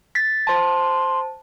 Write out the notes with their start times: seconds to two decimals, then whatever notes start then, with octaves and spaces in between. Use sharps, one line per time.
0.15 A6 B6
0.47 C5 A5 C6